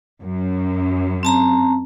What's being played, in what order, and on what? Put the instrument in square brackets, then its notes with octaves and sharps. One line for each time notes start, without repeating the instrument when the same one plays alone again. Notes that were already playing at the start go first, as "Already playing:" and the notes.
[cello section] F#2
[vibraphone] C4 A5 A#5